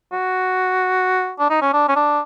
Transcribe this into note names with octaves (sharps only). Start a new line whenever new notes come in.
F#4
D4
D#4
C#4
D4
C#4
D4